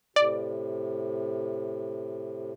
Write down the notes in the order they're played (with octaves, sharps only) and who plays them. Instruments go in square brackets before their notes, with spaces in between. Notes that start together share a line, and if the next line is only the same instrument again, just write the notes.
[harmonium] A2 C3 [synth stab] D5